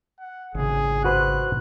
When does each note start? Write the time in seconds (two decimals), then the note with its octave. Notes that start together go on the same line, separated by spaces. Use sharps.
0.19 F#5
0.55 G#1 C#3 G#4
1.04 F#4 B4 C5 F#6